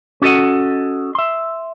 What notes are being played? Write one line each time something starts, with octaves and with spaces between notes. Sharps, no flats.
C#4 F#4 A4 D#5 F#5
E5 C6